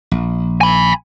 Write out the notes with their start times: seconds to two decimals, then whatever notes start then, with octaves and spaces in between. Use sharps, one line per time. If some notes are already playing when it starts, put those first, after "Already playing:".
0.11 A#1
0.61 G#5 B5